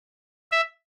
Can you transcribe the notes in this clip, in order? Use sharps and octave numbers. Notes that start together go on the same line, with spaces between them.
E5